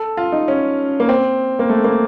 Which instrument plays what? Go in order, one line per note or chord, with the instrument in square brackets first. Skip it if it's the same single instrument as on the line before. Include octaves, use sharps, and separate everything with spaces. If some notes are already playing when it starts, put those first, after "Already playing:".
Already playing: [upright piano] A4
F4
D#4
C#4
A#3
C4
A#3
A3
A#3